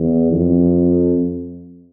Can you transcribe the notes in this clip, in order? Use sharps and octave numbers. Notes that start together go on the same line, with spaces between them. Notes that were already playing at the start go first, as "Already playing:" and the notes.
Already playing: E2
F2